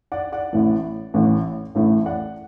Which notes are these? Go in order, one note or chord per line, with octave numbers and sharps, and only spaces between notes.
D5 F#5
D5 F#5
A1 A2 E3 A3
A1 A2 E3 A3
A1 A2 E3 A3
D5 F#5